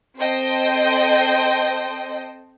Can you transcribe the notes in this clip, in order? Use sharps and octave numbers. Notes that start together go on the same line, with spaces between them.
C4 A4 C5 D#5 G5